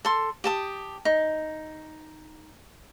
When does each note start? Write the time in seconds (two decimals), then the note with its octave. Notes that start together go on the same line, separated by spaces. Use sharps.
0.05 A4 C6
0.44 G4 A5 D#6
1.05 D#4